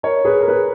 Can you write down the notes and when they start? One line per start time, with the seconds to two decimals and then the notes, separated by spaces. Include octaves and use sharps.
0.03 A#4 C#5
0.25 G#4 B4
0.40 A#4
0.48 G#4 B4